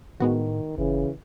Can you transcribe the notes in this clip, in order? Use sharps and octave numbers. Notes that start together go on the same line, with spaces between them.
A2 D#3 G#3 B3 F#4
F#1 C#3 E3